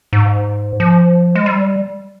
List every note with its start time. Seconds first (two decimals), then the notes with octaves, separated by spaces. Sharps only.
0.13 G#2
0.80 F3
1.35 G#3
1.46 G3